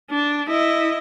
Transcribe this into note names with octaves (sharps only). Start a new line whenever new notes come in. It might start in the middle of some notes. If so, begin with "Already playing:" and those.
D4
E4 D#5